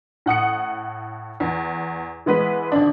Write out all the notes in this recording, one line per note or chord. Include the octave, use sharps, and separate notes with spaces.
A2 F#5 D#6 C#7
E2
E3 G#3 B3 B4 B6
G#1 D3 D4